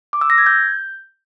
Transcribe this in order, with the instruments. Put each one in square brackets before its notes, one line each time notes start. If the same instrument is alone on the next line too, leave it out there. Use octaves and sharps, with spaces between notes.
[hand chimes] D6
E6
A#6
G#6
G6